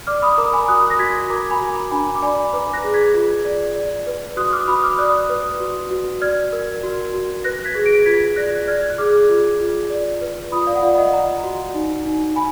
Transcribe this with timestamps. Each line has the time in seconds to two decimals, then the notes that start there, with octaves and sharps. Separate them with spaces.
0.07 D5 D6 F6
0.22 B5 D#6
0.38 A#4 A#5 D6
0.53 G#5 B5
0.68 F#4 D#6 F#6
0.90 A#6
0.99 F#4 G#6 B6
1.30 A#4 A#5 D6
1.51 G#5 B5
1.61 F#4
1.71 A#5 D6
1.91 D4 G#5 B5
2.15 D6
2.22 D5 G#5 B5
2.53 B4 A#5 D6
2.73 F#6 A#6
2.84 G#4
2.94 G#6 B6
3.14 F4
3.45 D5
3.76 D5
4.07 B4
4.37 F#4 D#6 F#6
4.53 D6 F6
4.68 F#4 B5 D#6
4.83 D6 F6
4.99 D5 D#6 F#6
5.29 B4
5.60 F#4
5.91 F#4
6.22 D5 F6 G#6
6.53 A#4
6.83 F#4
7.14 F#4
7.44 B4 F#6 A#6
7.65 G#6 B6
7.75 G#4
7.86 A#6 D7
8.06 F4 G#6 B6
8.36 D5 F#6 A#6
8.67 D5 F6 G#6
8.83 G#6
8.90 F#6
8.98 G#4 D6 F6
9.29 F4
9.60 F4
9.90 D5
10.21 B4
10.52 F4 B5 D#6
10.67 D5 F5
10.76 F#5
10.82 F4 D5 F5
10.98 D#5 F#5
11.13 D5 F#5 A#5
11.44 F#4
11.74 D#4
12.06 D#4
12.36 G#5 B5